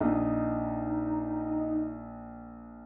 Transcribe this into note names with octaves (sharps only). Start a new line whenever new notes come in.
A#1 D#4